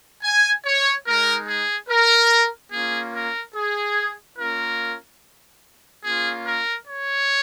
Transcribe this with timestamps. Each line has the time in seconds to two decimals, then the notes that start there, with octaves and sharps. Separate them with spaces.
0.24 G#5
0.65 C#5
1.06 G#3 D#4 A#4
1.48 G#4
1.89 A#4
2.72 A#3 C#4 F4 G#4
3.14 A#4
3.55 G#4
4.38 A#3 C#4 F4 A#4
6.04 A#3 C#4 F4 G#4
6.46 A#4
6.88 C#5